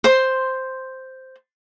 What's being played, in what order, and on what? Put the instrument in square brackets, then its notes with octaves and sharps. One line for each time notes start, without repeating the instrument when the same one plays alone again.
[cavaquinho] C5 C6